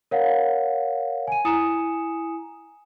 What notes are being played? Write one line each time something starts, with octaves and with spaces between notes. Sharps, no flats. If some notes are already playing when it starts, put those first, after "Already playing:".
A#4 C#5 F5 F#5
G#5 D#7
E4 G#5 A#5 D#6 C#7 E7